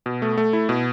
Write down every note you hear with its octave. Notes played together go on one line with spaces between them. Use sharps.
B2
A3
A3
E4
B2